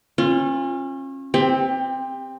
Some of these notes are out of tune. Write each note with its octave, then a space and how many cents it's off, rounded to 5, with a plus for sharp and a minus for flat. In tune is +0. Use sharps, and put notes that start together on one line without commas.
C#4 -35 F4 +0
C4 +0 G4 +25